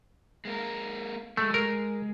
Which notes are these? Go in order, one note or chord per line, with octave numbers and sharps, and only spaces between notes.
G#3 A#3 A#4
G#3 A3
A#4